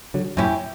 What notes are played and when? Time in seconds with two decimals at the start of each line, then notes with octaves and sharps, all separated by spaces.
0.14 D3 F#3
0.37 F#2 A#2 G3 C#4 E4 G4